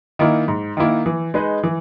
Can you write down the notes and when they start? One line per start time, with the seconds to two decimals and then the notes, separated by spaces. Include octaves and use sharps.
0.19 D#3 A#3 E4
0.48 G#2
0.77 D#3 A#3 E4
1.06 E3
1.34 G#3 D#4 G#4 B4
1.63 E3